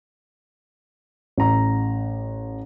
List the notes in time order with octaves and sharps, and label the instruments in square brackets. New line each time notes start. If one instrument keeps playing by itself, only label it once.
[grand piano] A1 A#5